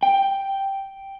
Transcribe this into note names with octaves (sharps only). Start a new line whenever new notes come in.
G5